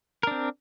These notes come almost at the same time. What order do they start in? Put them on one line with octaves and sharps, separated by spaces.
A#4 D4 C4